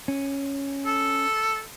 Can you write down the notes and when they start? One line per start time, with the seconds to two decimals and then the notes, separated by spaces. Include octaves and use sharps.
0.08 C#4
0.86 A4